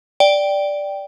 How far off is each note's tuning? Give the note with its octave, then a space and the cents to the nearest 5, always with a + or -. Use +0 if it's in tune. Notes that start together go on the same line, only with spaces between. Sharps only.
D5 +0 G5 +0